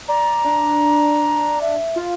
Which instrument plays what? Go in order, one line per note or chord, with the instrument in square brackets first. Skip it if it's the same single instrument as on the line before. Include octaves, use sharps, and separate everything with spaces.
[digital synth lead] D5 [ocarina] A#5
[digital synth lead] D4
[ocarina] E5
[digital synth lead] F4